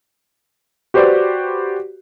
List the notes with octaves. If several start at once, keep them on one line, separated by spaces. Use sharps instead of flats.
F#4 G4 B4 C5 D5